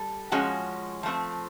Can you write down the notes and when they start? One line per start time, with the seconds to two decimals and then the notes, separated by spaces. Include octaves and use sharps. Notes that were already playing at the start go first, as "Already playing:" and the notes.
Already playing: G3 A4
0.32 F3 G#3 C#4 F#4
1.03 F3 A3 C4